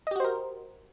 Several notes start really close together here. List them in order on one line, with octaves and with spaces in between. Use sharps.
D#5 G4 F#4 C5 A#4